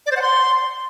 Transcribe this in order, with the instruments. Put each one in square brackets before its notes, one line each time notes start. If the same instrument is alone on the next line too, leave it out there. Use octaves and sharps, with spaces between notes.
[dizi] D5
C5
F#5
C6